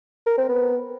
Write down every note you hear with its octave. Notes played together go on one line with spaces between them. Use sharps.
A#4
C4
B3